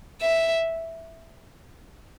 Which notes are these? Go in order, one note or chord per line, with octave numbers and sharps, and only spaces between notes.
E5